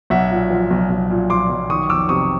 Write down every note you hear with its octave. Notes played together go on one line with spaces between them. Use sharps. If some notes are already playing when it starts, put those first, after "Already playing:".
B1 E5 F#5
A#2
F3
B1
B1
A#2
F3 C6 D6
B1
D#3 C#6 D#6
F2 D6 E6
C3 C#6 D#6